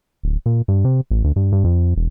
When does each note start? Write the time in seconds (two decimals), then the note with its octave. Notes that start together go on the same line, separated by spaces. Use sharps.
0.23 D1
0.46 A#2
0.68 G2
0.85 C3
1.11 A1
1.24 D2
1.36 G2
1.52 G2
1.64 F2
1.96 E1